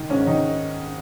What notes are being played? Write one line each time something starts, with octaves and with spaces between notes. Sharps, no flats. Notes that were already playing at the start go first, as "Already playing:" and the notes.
Already playing: D#3
G#2 C#4
D#3 D#4